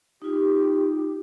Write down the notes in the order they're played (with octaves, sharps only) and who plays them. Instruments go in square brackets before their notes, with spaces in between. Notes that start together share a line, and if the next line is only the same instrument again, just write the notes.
[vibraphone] D#4 F4 [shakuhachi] G4